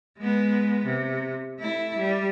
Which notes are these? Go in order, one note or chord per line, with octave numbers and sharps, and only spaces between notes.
G#3 B3
C3
A3 E4
G3